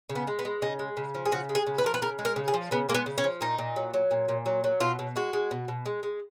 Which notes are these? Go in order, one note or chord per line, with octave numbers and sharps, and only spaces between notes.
C#3
B3
G#3
B3
G#3
C#3 D#4
G#3
C#3
F3
G#4
C#3 F#4
G#3
G#4
C#3
B4
F3 A#4
B4
C#3 A#4
G#3
A#4
C#3
G#4
F3
C#3 B3
G#3 A#3
B3
C#3
C#4
F3
A#2 D#4
A#2
F#3
F#3
A#2
A#2
F#3
F#3
B2 F4
B2
G#3 F#4
G#3
B2
B2
G#3
G#3